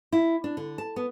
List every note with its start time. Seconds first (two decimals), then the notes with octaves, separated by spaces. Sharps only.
0.12 E4
0.44 D4
0.57 D3
0.78 A5
0.96 B3